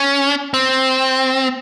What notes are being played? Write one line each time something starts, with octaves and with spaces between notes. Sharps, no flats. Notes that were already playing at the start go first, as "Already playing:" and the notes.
Already playing: C#4
C4